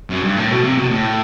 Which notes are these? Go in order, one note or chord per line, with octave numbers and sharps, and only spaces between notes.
F#2
G2
A2
B2
C3
B2
A2